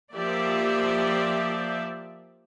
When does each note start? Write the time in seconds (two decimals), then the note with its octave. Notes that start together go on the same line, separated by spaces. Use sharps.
0.13 F3 A#3 G4 D5 E5